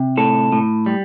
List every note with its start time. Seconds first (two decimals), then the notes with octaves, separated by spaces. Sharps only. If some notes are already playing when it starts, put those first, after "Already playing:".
Already playing: C3
0.17 A2 A4
0.52 A2
0.86 G3